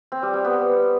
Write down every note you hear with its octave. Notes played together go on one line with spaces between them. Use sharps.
C4
G3
G3
B3